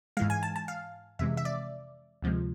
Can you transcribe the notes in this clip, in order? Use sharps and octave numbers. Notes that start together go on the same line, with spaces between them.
G#2 E3 G#3 F5
G#5
A5
A5
F5
F2 C3 E3 G#3 E5
E5
D5
D2 C3 F3 G#3